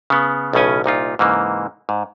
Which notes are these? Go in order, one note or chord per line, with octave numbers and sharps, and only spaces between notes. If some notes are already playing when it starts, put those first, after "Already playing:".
C#3 B3
B1 A2 C#3 C#4 G#5
C2 A#2 D#4 F4
G#2 C#3 E3 A#3
G#2